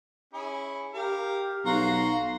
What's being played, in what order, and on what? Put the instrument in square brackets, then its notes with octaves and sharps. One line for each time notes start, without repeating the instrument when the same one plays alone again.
[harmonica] C#4 E4 G#4
[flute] G4 [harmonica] A#4 F5
[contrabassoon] B1 [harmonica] F#4 A#5 C6 [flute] F5